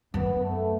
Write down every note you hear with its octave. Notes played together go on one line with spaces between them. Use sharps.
F#2 B3
A3